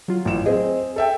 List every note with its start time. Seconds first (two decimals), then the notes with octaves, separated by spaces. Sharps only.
0.08 F#3 F4
0.25 A1 E7
0.46 C4 G#4 D#5
0.96 A4 E5 G5